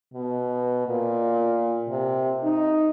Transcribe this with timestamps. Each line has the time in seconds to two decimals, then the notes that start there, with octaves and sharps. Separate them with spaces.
0.14 B2
0.87 A#2
1.89 C3
2.43 D#4